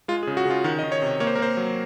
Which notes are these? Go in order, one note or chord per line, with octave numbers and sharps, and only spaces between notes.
G#3 F4
G#4
C#3
F#4
C#3 F4
D#3 F#4
D#5
D#3
C#5
C3
A#3 C#5
C5
A#4
A#3 C5
F#3